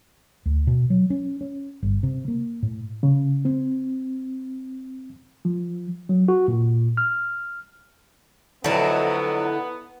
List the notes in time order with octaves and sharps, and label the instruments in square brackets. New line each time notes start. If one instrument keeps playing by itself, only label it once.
[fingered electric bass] D2
B2
F#3
C#4
C#4
G1
C3
A#3
A2
[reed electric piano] C#3
C4
F3
[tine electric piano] F#3
F#4
A#2
F6
[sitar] F2 A2 F#3 [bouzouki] D3 E4 [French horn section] B3